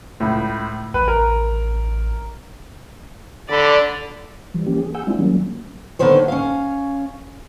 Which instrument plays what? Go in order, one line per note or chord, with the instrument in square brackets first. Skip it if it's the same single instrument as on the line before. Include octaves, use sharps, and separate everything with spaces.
[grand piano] C#2 A2
[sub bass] A1 [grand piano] B4
[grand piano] A#4
[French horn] D3 [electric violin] D5 B5
[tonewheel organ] E3 F3 G3
E3 A#3 C#4 G4
G#4
G#4 F#5 G#5 E6 G6
G3 G#3 C4 D4 E4 F4
D#3 F#3 G3 A#3 C#4
[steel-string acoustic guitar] D3 D#3 B3 C4 C5 C#5
C#4 F5